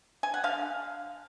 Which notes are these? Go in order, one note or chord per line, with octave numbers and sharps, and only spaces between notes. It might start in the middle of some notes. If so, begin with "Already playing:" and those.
G#5
F#5
D3 F5